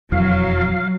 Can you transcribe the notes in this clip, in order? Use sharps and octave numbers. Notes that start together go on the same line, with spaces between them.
E1 F2 E3 F#3 F5